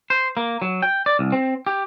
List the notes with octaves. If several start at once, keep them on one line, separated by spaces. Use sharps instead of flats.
C5
A#3
F#3
G5
D5
C2
C4
G4